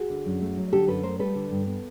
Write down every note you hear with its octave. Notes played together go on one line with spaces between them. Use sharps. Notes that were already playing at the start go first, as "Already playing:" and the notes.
Already playing: F#4 G#4
D3
F#2
A3
F#3
D3 G4 A4
F#2 A4 B4
A3 A#4 C5
G3 A4 B4
D3
G2
B3